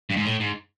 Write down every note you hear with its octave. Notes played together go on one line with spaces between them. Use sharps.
G2
G#2
A2
G#2